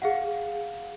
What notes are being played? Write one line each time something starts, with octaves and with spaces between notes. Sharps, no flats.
G#4 F5 F#5